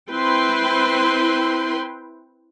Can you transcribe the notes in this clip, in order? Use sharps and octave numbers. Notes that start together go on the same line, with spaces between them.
C4 E4 B4 G5 C6